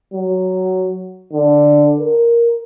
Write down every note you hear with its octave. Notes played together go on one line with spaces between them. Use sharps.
F#3
D3
A#4